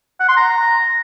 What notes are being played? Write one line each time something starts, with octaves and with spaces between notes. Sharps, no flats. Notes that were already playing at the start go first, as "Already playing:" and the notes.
F#5
C6
A#5